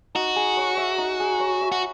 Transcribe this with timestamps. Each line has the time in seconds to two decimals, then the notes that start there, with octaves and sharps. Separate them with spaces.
0.15 D#4 F#4
0.36 G#4
0.57 C#5
0.77 E5
0.98 D#4
1.20 G#4
1.40 C#5
1.61 E5
1.72 F#4